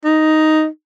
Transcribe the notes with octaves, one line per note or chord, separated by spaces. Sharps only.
D#4